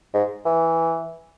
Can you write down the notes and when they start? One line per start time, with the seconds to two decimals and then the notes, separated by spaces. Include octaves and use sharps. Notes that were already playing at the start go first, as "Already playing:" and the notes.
0.14 G#2
0.45 E3